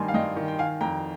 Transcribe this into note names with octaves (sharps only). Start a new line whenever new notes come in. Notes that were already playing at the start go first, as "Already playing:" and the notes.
Already playing: G2 D#3 G#5 C6
F5
G2 D#5 G5
D#3
G5
D#3 F5 G#5
F2 G5 A#5